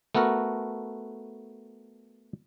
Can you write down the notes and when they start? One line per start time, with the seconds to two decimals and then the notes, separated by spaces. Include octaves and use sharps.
0.15 A3 B3 F#4 A4 A#4